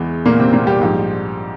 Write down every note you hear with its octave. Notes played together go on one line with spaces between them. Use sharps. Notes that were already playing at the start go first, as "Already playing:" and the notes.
Already playing: E2 E3 G#3
A#2 A#3
C3 C4
A#2 A#3
G3 G4
A#1 G#2 F3